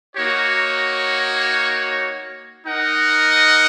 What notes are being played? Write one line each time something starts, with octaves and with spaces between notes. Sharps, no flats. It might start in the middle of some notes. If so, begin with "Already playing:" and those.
A#3 D#4 F#4 C#5
D#4 A#4 D#5 F#5